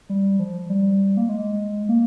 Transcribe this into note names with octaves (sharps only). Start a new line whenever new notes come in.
G3
F3
G3
A#3
G#3
A#3